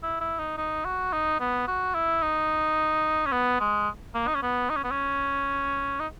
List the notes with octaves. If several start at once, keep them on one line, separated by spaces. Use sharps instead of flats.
E4
E4
D#4
D#4
F#4
D#4
B3
F#4
E4
D#4
C#4
B3
G#3
A#3
D#4
C#4
B3
D#4
C#4
B3
C#4
D#4